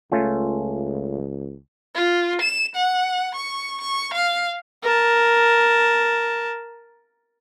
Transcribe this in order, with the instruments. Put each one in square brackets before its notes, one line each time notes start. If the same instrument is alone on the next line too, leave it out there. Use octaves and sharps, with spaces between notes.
[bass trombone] C#2 [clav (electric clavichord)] A3 C#4 F4
[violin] F4
E7
F#5
C#6
C#6
F5
[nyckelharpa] A#4 A5